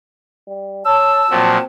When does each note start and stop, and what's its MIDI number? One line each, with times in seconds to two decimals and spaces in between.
0.47 0.84 55
0.85 1.24 73
0.85 1.62 81
0.85 1.34 88
1.31 1.58 46
1.31 1.58 53
1.31 1.58 54
1.31 1.65 60